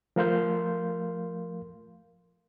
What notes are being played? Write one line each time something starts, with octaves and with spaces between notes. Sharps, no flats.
F3 A3 A#4 F5 C6 G6